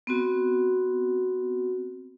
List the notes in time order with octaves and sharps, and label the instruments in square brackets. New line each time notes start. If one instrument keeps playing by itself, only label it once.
[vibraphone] B3 C4 F#4